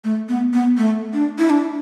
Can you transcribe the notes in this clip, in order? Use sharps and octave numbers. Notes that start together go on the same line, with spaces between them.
A3
B3
B3
A3
D4
E4
D4